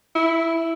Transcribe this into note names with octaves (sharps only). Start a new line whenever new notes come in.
E4